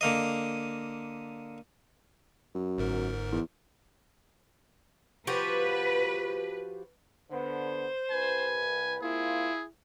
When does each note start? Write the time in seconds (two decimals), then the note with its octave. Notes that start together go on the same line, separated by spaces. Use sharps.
0.01 D3 A#3 D#5
2.55 F#2
2.78 G1 G#2 A#4
3.32 E2
5.27 F3 F#4 G4 B4
7.31 D3 B3 C5
8.11 C2 B4 G#5
9.02 A#3 C4 E4 F4 G#4